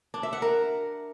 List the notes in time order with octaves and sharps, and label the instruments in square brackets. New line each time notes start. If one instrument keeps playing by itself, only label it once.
[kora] D4
E5
F#5
A#4